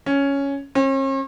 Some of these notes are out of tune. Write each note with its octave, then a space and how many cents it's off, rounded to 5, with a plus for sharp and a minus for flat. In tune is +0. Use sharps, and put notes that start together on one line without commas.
C#4 +5
C#4 -45